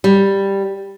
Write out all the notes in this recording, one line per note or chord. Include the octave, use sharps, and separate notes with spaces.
G3